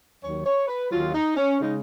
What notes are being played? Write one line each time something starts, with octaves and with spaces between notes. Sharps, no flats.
D#2 D#3 F#3 C#5
C#5
B4
D#2 D#3 F#3 F4
D#4
C#4
C#3 G#3 D#4